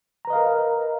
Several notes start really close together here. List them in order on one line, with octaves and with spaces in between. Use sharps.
A#5 B4 D#5 F5 A#4